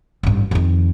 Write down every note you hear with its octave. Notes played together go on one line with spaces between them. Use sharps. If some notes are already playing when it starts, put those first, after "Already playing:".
A1 G2
F2 D#3